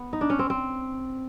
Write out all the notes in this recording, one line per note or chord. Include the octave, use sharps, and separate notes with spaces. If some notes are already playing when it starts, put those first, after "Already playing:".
Already playing: B3
D#4
D4
C#4
C4
C4